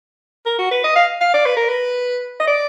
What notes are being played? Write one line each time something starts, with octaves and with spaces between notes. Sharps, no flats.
A#4
F#4
B4
D#5
F5
F5
D5
B4
A#4
B4
D#5
D5